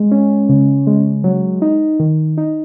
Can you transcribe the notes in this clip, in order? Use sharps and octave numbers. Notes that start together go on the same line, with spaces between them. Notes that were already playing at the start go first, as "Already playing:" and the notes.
Already playing: G#3
C#4
C#3
G#3
F#3
D#4
D#3
D#4